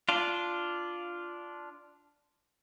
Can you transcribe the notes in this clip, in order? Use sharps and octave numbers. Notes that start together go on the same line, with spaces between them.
D4 F4